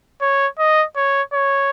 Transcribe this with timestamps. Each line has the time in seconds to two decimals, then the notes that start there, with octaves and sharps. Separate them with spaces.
0.21 C#5
0.59 D#5
0.96 C#5
1.33 C#5